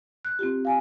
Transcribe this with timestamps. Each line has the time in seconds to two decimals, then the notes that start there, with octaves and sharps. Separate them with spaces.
0.25 F#6
0.39 C4 F4 G4
0.65 F5 G#5